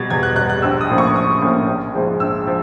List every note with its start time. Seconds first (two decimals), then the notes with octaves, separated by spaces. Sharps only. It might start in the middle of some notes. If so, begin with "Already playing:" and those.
Already playing: B2 G3 G#6 A6
0.10 E2 G#6
0.23 F#6
0.36 B2 F#6
0.41 G3
0.50 F#6
0.62 A#1 E6
0.81 D#6
0.90 A2 F3 A#3 C#4
0.98 C#6
1.15 A#1 D#6
1.41 A2 F3 A#3 C#4
1.68 A#1
1.94 G#2 F3 G#3
2.20 A#1 E6
2.47 F3